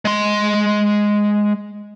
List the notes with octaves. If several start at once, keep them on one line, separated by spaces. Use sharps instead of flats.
G#3 C6